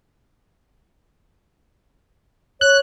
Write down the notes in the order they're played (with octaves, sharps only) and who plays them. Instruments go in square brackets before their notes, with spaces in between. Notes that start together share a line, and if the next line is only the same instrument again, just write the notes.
[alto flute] C#5 [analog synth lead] F#6